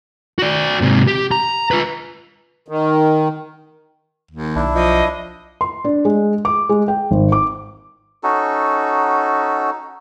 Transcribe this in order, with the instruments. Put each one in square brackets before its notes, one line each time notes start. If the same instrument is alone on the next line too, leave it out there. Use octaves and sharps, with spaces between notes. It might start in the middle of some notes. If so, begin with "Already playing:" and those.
[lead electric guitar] F#4 D5
G#2 C3
G4
A#5
F4 B4
[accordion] D#3
[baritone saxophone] D#2
[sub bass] B1 [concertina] D4 E4
[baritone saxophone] F3 [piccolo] D#5
[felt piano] C6
D4
G#3
D6
G#3
G5
G#1
D6
[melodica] C#4 D#4 F#4 A4